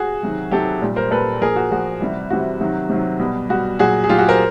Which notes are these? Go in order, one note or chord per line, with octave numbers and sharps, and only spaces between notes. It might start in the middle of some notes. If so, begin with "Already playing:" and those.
Already playing: F#4 G#4
C3 D#3 F#3
C3 D#3 F#3 G4 A4
A#2 G3
A#4 C5
A#2 G3 A4 B4
A#2 F3 G#4 A#4
F#4
A#2 F3 F#4
C3 E3 G3
C3 E3 G3 F#4
C3 D#3 F#3
C3 D#3 F#3
B2 G3
B2 G3 F#4
A#2 F#3 F#4 G#4
G#4
A#2 F#3 F4 G4
F#4 G#4
A#4 C5